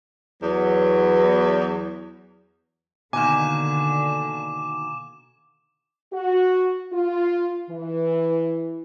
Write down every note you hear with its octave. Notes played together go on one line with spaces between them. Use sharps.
E2 F#3 B3
B2 D3 D#3 A#3 G#5 D6 E7
F#4
F4
E3